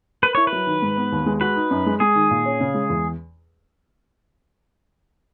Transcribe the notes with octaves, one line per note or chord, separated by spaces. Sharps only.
A#4 B4
E4 C#5
B4
F#3
D#3
G#2
B3
D#2
G#3
F#4 B4
D#4
F#2
G#3
G#3 G#4
D#3
A#2
C#4
C#3
G#3
E2